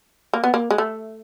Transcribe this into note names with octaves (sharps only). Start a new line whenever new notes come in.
A#3
B3
A#3
G#3
A3